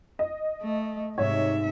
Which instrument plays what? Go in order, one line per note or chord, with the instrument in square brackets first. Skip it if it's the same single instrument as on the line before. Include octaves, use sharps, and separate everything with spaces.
[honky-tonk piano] D#5
[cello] A3
[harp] G#2 G#3 [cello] C3 E5 [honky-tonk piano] C#5